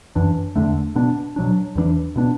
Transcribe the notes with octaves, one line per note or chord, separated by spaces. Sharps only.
F#2 E3 D4
E2 D3 A3 D4
B2 B3 D4
B2 F#3 D4
E2 E3 B3 D4
B2 B3 D4